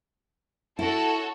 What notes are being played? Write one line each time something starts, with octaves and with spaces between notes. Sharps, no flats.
E4 F#4 A4 C#5